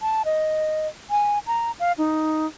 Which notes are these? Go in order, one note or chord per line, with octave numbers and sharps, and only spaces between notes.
A5
D#5
G#5
A#5
F5
D#4